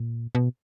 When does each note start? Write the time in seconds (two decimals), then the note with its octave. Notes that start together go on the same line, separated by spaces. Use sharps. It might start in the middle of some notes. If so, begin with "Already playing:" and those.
Already playing: A#2
0.35 B2